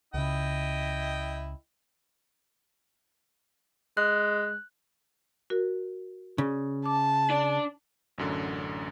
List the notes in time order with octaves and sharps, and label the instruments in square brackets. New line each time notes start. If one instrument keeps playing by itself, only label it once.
[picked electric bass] C#2 C#3 [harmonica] E4 D#5 G5
[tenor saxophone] G#3 [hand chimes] F#6
[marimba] F#4 A#4
[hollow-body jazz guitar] C#3 [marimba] D5
[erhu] A5 [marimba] D6
[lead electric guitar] D4 D5
[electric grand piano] A1 F#2 D3